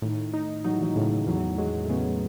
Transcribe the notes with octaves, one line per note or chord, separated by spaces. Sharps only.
A2 D#3
D#4
F#3 D#4
E3
D#3 F#3
A2 C#3 E3
E2 D#3 F#3
E3 F#3 G#3
A3
C#3 G#3 B3